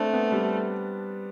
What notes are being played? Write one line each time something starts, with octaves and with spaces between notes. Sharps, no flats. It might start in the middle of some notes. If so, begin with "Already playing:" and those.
Already playing: A3 C4 D4
B3
G3